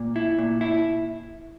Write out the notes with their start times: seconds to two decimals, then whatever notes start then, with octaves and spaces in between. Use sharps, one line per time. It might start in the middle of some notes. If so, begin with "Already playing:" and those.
Already playing: A#2
0.16 E4
0.38 A#2
0.61 E4